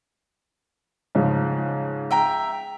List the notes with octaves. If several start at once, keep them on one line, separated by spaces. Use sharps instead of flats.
G#2 C#3 F3
E5 G5 A#5